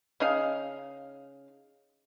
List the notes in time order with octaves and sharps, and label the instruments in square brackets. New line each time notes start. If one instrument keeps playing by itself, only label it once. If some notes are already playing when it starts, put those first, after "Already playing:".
[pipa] C#3 D#4 F5